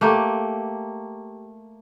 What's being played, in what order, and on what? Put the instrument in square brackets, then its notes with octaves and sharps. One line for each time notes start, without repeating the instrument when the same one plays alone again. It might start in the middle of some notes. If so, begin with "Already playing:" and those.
[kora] A3 A#3 G4